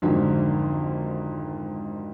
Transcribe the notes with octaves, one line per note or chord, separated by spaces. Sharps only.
G#1 F2 G#2 D3 F#3